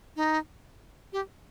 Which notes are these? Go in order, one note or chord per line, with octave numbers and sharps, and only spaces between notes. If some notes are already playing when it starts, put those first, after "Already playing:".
D#4
G4